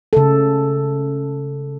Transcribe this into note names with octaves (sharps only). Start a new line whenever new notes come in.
C#3 A4